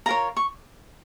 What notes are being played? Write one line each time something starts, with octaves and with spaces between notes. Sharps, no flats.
F4 A#4 C#5 A#5
C#6